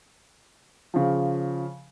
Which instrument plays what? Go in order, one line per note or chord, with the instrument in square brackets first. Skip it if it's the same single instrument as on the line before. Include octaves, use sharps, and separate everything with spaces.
[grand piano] C#3 F3